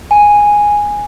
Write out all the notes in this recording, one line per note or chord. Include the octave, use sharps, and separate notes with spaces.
G#5